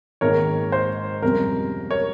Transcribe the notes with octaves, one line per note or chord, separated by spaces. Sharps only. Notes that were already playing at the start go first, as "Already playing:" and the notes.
G#1 G#2 D#3 A#3 A#4 C#5
C5
G1 F2 C3 G3 C#4 A#4
A#4 C#5